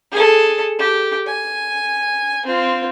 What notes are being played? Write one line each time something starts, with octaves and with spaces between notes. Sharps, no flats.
G#4 A4
G4
G#5
C4 F4